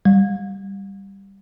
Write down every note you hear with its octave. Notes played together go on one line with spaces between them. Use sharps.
G3